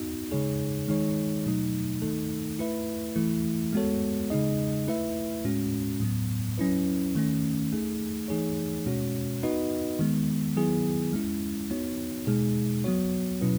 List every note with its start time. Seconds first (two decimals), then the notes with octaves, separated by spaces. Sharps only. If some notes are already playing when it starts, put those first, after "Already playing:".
Already playing: B3 D#4 F#4
0.32 C#3 G#3 D#4 G#4 C#5
0.88 D#3 G#3 D#4 G#4 C#5
1.46 B2 F#3 A3 D#4
2.02 D#3 A3 D#4 A4
2.59 A3 E4 B4 E5
3.16 E3 A3 E4
3.73 G#3 B3 F#4 A4 C#5
4.30 C#3 G#3 D#4 G#4 D#5
4.87 A3 E4 B4 E5
5.45 A2 G#3 C#4 F#4
6.00 A2 F#3 B3
6.58 F#3 C#4 E4 B4
7.15 D#3 A3 C#4
7.72 A3 D#4 G#4
8.28 E3 A3 D#4 G#4 C#5
8.86 B2 G#3 C#4 F#4 C#5
9.43 B3 D#4 F#4 B4 D#5
9.99 D#3 G#3 B3
10.56 D#3 F#3 B3 E4 G#4
11.13 G#3 C#4 E4
11.70 B3 D#4 F#4 C#5
12.27 B2 G#3 D#4 G#4
12.84 F#3 B3 F#4 C#5
13.41 B2 F#3 C#4 E4 B4